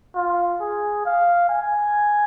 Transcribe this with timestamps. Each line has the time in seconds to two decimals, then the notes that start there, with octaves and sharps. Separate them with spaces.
0.15 F4
0.61 G#4
1.05 F5
1.49 G#5